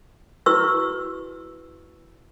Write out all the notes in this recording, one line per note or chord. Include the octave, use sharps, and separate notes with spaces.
E4 F#4 B4 C#6 E6